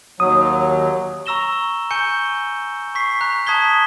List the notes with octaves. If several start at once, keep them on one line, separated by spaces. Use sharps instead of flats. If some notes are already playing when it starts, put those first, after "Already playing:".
D#2 F#3 D#6
A#5 C#6 E6 A#6 E7 G7
G#5 C#6 G6 C#7 G7
C#6 B6 C7
A#5 F#6
A5 D#6 G#6 B6 G7